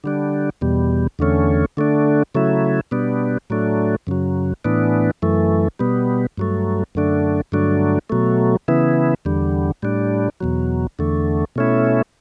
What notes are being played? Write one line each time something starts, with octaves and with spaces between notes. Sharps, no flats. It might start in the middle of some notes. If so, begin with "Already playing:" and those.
D3 G3 D4
E2 B2 G3
E2 D3 A3 C#4
D3 A3 D4
C#3 F#3 A3 E4
B2 G3 B3 D4
A2 F#3 A3 D4
F#2 C#3 F#3
A2 E3 B3 D4
F#2 E3 A3
B2 G3 B3
G2 F#3 A3
F#2 D3 A3 D4
G2 D3 F#3 A3 D4
B2 F#3 A3
C#3 E3 B3 E4
E2 D3 G3
A2 G3 D4
E2 B2 F#3
E2 D3 A3
B2 A3 C#4 E4